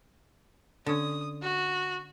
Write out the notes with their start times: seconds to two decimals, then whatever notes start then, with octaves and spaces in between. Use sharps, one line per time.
0.86 D3 C#4 D#6
1.42 F#4